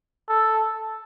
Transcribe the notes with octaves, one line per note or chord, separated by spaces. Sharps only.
A4